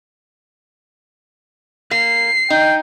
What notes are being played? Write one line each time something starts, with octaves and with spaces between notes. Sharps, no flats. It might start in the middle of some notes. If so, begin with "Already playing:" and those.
A#3 C7
D#4 G5